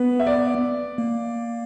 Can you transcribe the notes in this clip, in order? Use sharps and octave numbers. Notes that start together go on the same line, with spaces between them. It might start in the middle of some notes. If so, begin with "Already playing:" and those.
Already playing: B3 B4
E5
D5
A#3